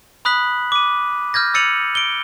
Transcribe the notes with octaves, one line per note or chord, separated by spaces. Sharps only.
B5 D#6 F#6 B6 F#7
D6 D#7
F6 G6 G#6 A#6
E6 A6 C#7 D#7 F7 F#7
D7 G7